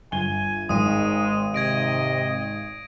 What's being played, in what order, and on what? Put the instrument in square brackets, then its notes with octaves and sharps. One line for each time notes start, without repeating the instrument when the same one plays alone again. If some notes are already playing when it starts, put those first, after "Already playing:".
[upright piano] G1 G7 [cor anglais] G#5
[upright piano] G#1 [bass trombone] G#2 [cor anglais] G#3 [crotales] D#6 D#7
[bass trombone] C3 [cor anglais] D#5 [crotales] G#6 A#6 D7